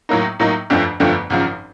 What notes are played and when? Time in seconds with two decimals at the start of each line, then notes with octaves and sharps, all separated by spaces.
0.09 A2 F#3 A#3 D#4
0.40 A2 F#3 A#3 D#4
0.70 G1 F2 D3 F3 A3
1.00 G1 F2 D3 F3 A3
1.30 G#1 F#2 C#3 F3